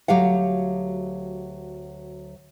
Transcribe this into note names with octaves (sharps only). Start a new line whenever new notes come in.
D2 F#3 G4 F5 F#5